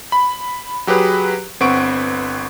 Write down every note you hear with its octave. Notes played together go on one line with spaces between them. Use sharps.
B5
F#3 G4 G#4 B4
G1 C4 B4 F#5 C#6 D7